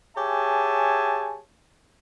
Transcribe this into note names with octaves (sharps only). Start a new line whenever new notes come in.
G4 G#4 C#5 E5 G#5 A5